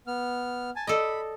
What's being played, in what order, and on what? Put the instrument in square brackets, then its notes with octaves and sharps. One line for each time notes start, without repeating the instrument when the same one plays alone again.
[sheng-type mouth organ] B3 F6
G#5 A5
[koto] A4 D5 D#5 [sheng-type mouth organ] B5